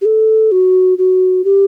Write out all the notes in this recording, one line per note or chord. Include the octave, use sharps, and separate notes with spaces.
G4
A4
F#4
F#4
G4